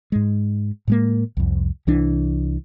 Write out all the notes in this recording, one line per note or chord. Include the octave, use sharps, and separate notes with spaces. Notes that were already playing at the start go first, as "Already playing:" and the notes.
G#2 G#3
A2 G#3 A#3
C2 F2
C2 E3 D4